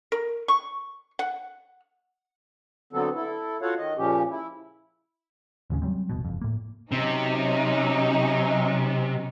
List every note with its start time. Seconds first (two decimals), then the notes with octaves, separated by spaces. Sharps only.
0.12 A#4
0.48 C#6
1.19 F#5
2.93 D3 F#3 B3 C4 A4
3.15 E4 A4
3.62 F4 F#4 A4 C#5 F5 F#5
3.77 D#3 D#5
3.98 A#2 C#3 F3 C#4 G4
4.30 E4
5.70 A1 D#2 C#3 C#4
5.82 F#3 G3 C4
6.09 E1 A#1 B2
6.25 F#1 F2
6.41 A2 A#3
6.92 C3 F#3 C#4 D#4